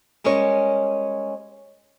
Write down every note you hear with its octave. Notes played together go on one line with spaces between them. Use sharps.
G3 G#3 C#4 A#4 C#5